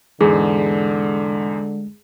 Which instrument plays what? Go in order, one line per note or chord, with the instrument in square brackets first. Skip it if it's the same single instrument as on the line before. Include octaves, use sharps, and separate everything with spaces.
[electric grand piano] E2 G#2 [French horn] D3 [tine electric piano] G#3 [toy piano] G#4